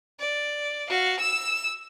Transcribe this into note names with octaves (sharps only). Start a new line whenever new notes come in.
D5
F#4 F5
E6 E7